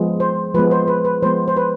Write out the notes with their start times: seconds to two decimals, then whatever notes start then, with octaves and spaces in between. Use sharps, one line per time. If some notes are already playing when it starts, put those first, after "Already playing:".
Already playing: F3 G#3 B3
0.20 C5
0.55 F3 G#3 B3 B4
0.71 C5
0.88 B4
1.05 B4
1.22 F3 G#3 B3 C5
1.48 C5
1.57 B4